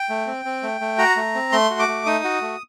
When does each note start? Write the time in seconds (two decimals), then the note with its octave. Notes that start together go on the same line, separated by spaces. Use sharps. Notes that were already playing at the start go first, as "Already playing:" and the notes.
Already playing: G5
0.09 A3
0.27 C4
0.45 C4
0.63 A3
0.81 A3
0.98 F#4 A#5
1.16 A3
1.34 C4
1.52 A3 C6
1.71 F#4
1.79 D6
1.88 A3
2.06 D#4 D#6
2.24 F#4
2.41 A3